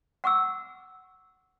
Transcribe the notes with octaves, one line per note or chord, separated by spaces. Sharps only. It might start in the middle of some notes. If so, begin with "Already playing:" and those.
F#5 C#6 D6 E6